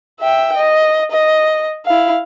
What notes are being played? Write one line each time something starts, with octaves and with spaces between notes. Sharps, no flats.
E5 G5
D#5
D#5
E4 F5